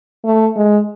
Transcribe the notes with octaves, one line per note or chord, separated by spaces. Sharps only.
A3
G#3